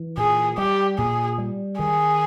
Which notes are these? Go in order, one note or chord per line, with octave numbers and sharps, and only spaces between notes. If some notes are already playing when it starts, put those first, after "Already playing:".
Already playing: E3
A#2 G#4
G3 G4
A#2 G#4
G3
D#3 G#4